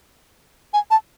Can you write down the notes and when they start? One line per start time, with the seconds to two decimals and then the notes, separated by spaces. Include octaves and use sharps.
0.74 G#5
0.91 A5